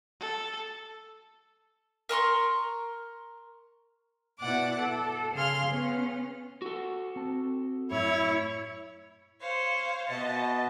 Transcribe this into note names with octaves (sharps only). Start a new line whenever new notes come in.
A4
A#4 A#5 C6 C#6
B2 E4 D5 F#5 D6
A4
C#3 G#4 F5 C6 F6
B3 C#4
F#4 A4
C4 A5
F#2 A2 E4 C#5
C5 C#5 F5
B2 D#5 E5 A5